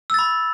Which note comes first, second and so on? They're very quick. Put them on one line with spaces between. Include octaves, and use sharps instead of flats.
E6 A6 B5